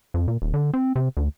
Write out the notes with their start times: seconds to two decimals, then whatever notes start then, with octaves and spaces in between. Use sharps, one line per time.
0.14 F2
0.28 A#2
0.42 D#1
0.54 D3
0.74 C4
0.96 C3
1.17 D2